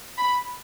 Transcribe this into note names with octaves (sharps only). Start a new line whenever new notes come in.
B5